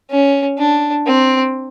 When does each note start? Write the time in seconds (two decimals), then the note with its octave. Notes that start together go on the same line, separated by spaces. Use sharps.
0.10 C#4
0.58 D4
1.06 C4